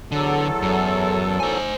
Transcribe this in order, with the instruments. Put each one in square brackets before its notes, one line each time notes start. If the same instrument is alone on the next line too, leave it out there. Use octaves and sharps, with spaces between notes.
[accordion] E2 F#3 A4 [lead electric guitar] D3
[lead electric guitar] F#2
C5 G#5